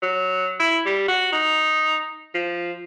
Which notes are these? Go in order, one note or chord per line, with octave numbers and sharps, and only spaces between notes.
F#3
E4
G3
F#4
D#4
F3